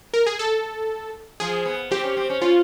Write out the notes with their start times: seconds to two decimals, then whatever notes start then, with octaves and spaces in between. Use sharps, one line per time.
0.14 A#4
0.26 G#4
0.39 A4
1.40 F3 G#4
1.66 B3
1.91 C4 G4
2.04 C#4
2.17 C4
2.30 C#4
2.41 C#4 F4